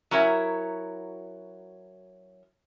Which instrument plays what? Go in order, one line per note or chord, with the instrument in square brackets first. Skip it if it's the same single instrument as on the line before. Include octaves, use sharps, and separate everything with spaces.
[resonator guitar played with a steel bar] F#3 C#4 E4 A#4